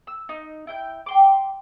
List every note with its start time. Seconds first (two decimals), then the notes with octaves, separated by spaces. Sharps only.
0.07 E6
0.29 D#4
0.67 E4 G5 G6
1.06 G5 C6 D6